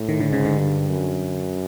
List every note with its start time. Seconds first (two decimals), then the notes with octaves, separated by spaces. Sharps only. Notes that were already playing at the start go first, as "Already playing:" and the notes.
Already playing: A2
0.09 D#3
0.20 D3
0.29 G#2 C#3
0.45 D3
0.59 G2
0.89 F#2